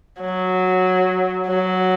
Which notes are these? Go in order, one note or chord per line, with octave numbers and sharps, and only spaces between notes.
F#3
F#3